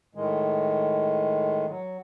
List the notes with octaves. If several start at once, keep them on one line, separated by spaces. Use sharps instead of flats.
A2 D#3 G#3
F#3